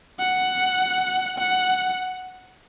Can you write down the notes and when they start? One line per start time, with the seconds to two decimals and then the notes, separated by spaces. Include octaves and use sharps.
0.19 F#5
1.38 F#5